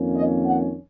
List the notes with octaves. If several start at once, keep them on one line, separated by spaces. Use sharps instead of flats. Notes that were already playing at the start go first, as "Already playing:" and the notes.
Already playing: F2 D#3 A#3 C#4
D#5
F#5